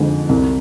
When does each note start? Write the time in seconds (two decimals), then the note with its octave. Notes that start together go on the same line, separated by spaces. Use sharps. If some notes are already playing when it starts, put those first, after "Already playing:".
Already playing: F2 D3 F3 G#3
0.29 C2